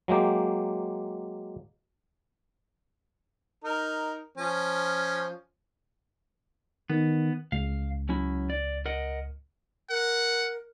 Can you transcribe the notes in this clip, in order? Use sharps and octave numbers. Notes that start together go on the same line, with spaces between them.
F#3 G#3 A#3 G4
D#4 A#4
F3 C#4
D#3 B3
C#2 F5
F#3 C#4 E4
D5
A#4 D#5 F#5
A#4 F#5